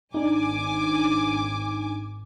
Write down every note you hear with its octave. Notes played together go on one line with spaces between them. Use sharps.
G#1 D4 D#4 G#5 D6